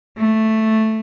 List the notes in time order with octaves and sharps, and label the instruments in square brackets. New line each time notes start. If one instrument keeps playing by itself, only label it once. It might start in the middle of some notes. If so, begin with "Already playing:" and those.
[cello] A3